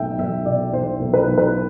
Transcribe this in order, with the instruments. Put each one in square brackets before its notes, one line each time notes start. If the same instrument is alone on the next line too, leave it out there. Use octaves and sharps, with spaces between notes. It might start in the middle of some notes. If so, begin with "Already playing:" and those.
Already playing: [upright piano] B1 A3 E5 G5
B1 E5
B2 D5
B1 C5
B1
B4
B1
B4